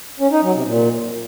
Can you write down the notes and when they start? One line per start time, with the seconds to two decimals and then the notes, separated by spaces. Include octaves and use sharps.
0.20 C#4
0.31 D#4
0.43 F#3
0.54 C3
0.65 A#2